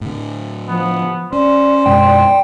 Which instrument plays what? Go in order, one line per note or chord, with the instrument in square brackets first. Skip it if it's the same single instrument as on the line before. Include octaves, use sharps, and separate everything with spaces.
[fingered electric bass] A2 D3
[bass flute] F3 [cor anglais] B3
[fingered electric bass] C#4 [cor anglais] C5 [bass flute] D5
[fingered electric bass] F#2 B2 G#3 [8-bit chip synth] G5